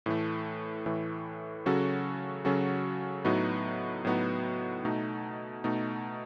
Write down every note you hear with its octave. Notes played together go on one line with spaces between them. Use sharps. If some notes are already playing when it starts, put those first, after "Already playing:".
A2 E3 A3
A2 E3 A3
C#3 F#3 C#4 F#4 A4
C#3 F#3 C#4 F#4 A4
A2 F#3 B3 D#4 F#4
A2 F#3 B3 D#4 F#4
B2 A3 D#4
B2 A3 D#4